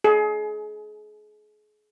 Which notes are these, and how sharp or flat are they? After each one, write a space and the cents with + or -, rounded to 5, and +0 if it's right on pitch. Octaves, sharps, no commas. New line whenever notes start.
G#4 +35